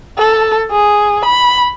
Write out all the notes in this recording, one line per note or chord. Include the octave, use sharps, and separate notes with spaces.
A4
G#4
B5